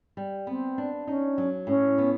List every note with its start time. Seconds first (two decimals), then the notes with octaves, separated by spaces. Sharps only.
0.17 G3
0.47 B3 C4
0.78 D4
1.07 C#4 D#4
1.38 F#3
1.67 A2 C#4
1.98 B3